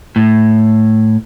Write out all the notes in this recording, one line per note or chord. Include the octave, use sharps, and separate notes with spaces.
A2